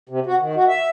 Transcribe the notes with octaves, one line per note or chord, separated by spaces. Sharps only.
C3
F#4
D#3
F#4
E5